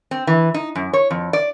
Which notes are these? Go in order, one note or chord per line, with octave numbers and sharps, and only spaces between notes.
C4
E3
D#4
F#2
C#5
F2
D5